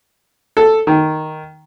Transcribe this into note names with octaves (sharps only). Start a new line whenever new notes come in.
A4
D#3